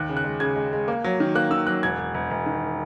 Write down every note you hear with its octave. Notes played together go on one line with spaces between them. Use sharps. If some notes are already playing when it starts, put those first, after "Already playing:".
Already playing: D#2 F#6
C#3
F#6
G#3
C#3 G#6
G#3
G#3
A#3
F#3
D#3
A#3 F#6
D#3 E6
F#3 F#6
E1 G#6
E1
E1
E1
D#3